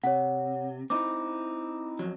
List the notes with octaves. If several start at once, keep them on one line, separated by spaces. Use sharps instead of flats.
C3 C#5 F#5
C4 D#4 E4 D6
F2 F#3